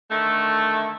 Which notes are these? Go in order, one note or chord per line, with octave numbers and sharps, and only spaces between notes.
D3 D#3 A3